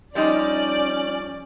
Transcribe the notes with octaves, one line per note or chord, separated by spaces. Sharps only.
F3 G3 C#4 D#4 D5